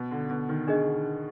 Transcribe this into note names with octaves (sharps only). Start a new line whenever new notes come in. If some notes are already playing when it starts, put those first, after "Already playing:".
Already playing: B2
D3
B2
D#3
D#3 D4 G#4 D#5